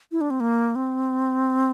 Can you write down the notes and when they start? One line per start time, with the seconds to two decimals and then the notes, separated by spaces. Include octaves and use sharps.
0.12 E4
0.21 D4
0.30 C4
0.40 A#3
0.76 C4